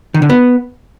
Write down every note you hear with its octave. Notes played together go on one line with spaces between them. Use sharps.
D#3
D3
B3